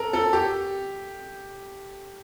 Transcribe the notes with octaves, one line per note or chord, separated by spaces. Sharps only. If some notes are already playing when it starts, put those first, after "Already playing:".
Already playing: A4 A#4
A4
G4